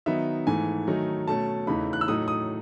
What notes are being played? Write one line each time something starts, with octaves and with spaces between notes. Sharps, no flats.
D#3 F#3 B3 D#4 E5
G#2 E3 A3 G#5
D#3 F#3 A3 D#4
B2 A3 C#4 A5
E2 C#3 E3 A3 D#4 B5
F#6
E6
A2 F#3 A3 D#4 D#6
D#6